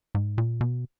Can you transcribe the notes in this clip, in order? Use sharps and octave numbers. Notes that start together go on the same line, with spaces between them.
G#2
A#2
B2